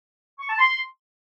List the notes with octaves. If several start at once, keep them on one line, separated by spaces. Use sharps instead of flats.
C#6
A5
C6